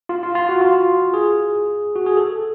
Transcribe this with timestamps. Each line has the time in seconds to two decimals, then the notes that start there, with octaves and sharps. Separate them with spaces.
0.09 F4
0.23 F4
0.35 F4
0.49 F#4
0.61 F4
1.14 G#4
1.96 F#4
2.06 G#4
2.17 A4